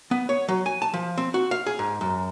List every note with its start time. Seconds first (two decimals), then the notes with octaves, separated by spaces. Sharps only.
0.11 B3
0.29 C#5
0.49 F#3
0.66 G#5
0.82 A5
0.94 F3
1.18 C4
1.34 F#4
1.51 F5
1.66 G#4
1.79 G#2
2.01 F#2